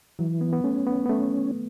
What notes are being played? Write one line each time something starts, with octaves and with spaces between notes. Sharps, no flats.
E3 F#3
B3
B3
A3 C#4
B3
B3
A3 C#4